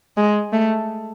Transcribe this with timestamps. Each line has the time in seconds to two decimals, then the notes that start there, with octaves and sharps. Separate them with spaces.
0.17 G#3
0.53 A3